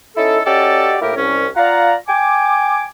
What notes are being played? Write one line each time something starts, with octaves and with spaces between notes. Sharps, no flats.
C#4 D#4 E4 A4
C#4 F#4 G4 A4 D5 D#5
A2 A#3 E4 G4 A#4
C2 C#4
F4 D5 F5 F#5 A#5
G5 G#5 D6